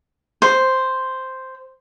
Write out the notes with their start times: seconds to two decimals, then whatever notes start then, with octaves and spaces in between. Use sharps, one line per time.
0.42 C5